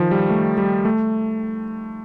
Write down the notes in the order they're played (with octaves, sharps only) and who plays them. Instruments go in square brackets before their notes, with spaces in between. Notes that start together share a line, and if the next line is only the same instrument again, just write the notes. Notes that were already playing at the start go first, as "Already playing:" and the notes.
Already playing: [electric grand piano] D#3 F3
G3
A3
G3
A3